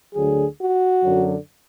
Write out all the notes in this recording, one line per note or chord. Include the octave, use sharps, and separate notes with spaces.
D2 D3 F#3 G#4
F#4
F#2 D3 F#3